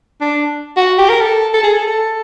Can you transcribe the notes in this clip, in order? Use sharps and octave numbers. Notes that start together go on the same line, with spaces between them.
D4
F#4
G4
A#4
A4
A4
G#4
A4
A4